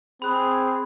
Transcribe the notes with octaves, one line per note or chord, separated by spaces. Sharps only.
C4 G#4 B5 F#6